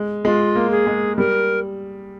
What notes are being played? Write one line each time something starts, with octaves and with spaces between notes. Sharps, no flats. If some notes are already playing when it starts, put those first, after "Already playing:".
Already playing: G#3
G#3 F4
A#3
G#4
G#3
G3 A#4